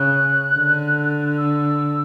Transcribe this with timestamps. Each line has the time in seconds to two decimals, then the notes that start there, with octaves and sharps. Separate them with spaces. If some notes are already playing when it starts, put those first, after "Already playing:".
Already playing: C#3 F#6
0.55 D3
1.38 E6